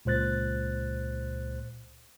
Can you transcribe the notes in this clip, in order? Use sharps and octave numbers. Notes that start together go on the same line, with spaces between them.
C#2 A#2 C5 F#6 A6